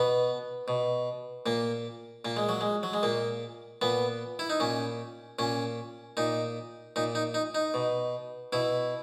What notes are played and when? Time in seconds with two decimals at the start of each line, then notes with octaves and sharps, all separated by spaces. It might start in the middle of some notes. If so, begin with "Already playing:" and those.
Already playing: B2 B3
0.68 B2
1.46 A#2 A#3
2.25 A#2 A#3
2.37 G#3
2.49 F#3
2.61 G#3
2.83 F#3
2.93 G#3
3.03 A#2 A#3
3.82 A#2 B3
4.39 E4
4.50 D#4
4.60 A#2 C#4
5.39 A#2 C#4
6.17 A#2 D#4
6.96 A#2 D#4
7.15 D#4
7.34 D#4
7.55 D#4
7.74 B2
8.53 B2 E4